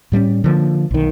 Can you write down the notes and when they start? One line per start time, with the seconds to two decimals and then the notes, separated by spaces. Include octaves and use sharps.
0.12 A2 G3 B3 C#4
0.44 D3 F3 A#3
0.91 B1 D#3